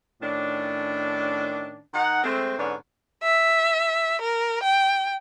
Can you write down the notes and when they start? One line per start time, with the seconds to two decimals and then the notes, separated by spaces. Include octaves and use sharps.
0.22 A2 D#3 C#4 D4
1.94 D#3 D#4 F#5
2.24 G#3 A3 C4
2.58 G#2 D3 B3 C#4 D4
3.23 E5
4.21 A#4
4.63 G5